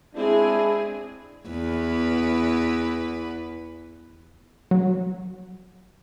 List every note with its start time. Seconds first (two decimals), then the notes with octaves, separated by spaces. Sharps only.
0.15 G#3 C4 D4 E4 G#4
1.48 E2 B4
4.71 F#3